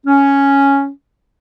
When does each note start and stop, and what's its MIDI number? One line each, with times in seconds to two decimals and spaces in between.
0.06 0.89 61